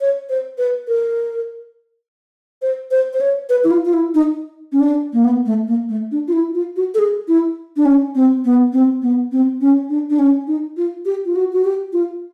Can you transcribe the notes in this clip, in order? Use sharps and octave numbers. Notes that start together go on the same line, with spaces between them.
C#5
C5
B4
A#4
C5
C5
C5
C#5
B4
E4
F4
F4
E4
D#4
C#4
D4
A#3
B3
A3
A#3
A3
D4
F4
E4
F4
F#4
A4
G#4
E4
D4
C#4
C4
B3
C4
B3
C4
C#4
D4
D4
C#4
D#4
F4
G4
F4
F#4
F#4
G4
F4